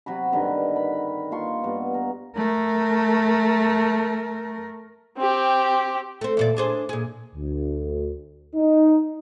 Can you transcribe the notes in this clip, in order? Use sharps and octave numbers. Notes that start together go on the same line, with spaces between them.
C3 F#3 F#4 B5
G2 D3 D#3 B4
B5
A#3 F4 C6 C#6
G2 B3
A#4
A3 A#4
C4 G4
A3 C4
E2 A#2 D5
D4 G#4 C5
A#2 G#4
D2
D#4